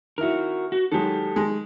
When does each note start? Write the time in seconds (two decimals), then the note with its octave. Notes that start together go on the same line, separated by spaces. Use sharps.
0.18 D#3 E4 F#4 A#4
0.72 F#4
0.92 D#3 F#3 G#3 G4 A4
1.36 D#3 G#3